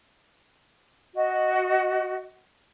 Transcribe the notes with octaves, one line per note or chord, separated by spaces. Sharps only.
F#4 D#5